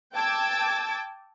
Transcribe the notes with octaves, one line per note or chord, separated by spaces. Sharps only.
G5 A5 D6 E6 G#6 A6